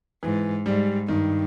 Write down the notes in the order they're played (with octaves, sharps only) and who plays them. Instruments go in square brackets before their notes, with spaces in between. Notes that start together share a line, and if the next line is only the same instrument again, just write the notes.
[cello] G#2 [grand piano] E3
[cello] G#2 [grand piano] G3
[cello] G2 [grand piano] D#3